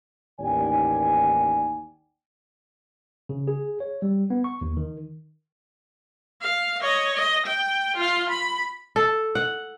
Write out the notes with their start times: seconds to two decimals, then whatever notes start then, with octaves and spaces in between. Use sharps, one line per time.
0.40 A1 D#2 D#3 D5 G5 G#5
3.29 C#3
3.48 G#4
3.80 C#5
4.02 G3
4.30 B3
4.44 C#6
4.61 D#2
4.77 D#3
6.42 F5
6.82 C#5 D#5
7.15 D#5
7.46 G5
7.97 F4 F5
8.30 B5
8.96 A4
9.35 F#5